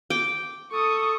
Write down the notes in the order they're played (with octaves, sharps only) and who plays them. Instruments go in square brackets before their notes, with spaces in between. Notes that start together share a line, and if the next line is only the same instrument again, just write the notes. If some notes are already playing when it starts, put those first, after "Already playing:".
[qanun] G5 D6
[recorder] A4 [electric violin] C#6 D#6